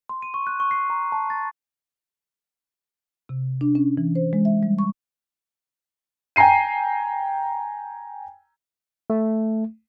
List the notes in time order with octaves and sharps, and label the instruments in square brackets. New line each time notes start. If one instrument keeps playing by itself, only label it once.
[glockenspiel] C6
D#7
C#6
F#6
C#6
C7
A#5
A5
A6
[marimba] C3
D4
C#4
E3
C5
G#3
E5
G3
C#6
[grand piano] G5 G#5 A#5 C7 D#7
[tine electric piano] A3